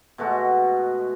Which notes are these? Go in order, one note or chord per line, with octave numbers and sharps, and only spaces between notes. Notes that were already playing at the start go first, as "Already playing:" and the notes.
B2 G#3 A3 F#4